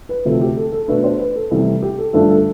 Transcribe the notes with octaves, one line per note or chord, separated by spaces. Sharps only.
B4
D2 C3 F3 C4 A4
G4
A4
A4
B2 A3 D4 B4
C5
B4
A4
C2 C3 E3 A3
G4
A4
G2 D3 F3 A3 D4 A4
A4